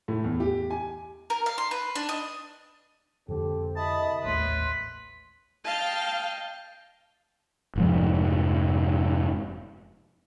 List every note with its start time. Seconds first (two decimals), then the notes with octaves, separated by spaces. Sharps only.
0.08 A2
0.24 E2
0.40 G4
0.71 G#5
1.30 A#4
1.46 F5
1.58 C6
1.71 B4
1.95 D4
2.09 D#5
3.28 F2 D3 C4 G4 A4
3.76 C2 D#5 E5 A5 B5 D#6
4.24 A1 D#2 A3 B4 C#5 C6
5.65 D#5 F5 G5 A5
7.76 F1 G#2 F3